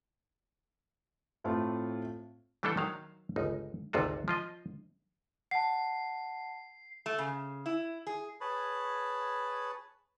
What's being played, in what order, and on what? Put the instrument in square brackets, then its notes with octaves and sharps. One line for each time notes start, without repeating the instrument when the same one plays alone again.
[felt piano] A2 A3 C4 F4
[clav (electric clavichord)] E3 G3 A3 D4 E4 A4
D#3 F#3 C5 F5
G1 C#2 D#4
G#1 D2 C3 F4 F#4
F3 F4 D#5
[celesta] F#5 A5 [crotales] C7
[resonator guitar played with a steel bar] A3
C#3
E4
G#4
[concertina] G#4 B4 C#5 A5 B5